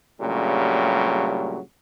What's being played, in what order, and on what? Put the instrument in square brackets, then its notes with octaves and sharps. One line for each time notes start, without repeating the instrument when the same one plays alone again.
[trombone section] G2 A#2 C#3 F#3 G3 A3